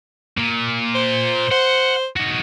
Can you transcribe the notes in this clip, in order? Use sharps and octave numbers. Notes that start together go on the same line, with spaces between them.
A#2
C5
C5 F#5
D#4 F#4